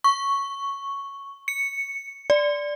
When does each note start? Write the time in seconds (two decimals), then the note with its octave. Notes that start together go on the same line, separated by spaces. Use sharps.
0.04 C#6
1.48 C#7
2.30 D5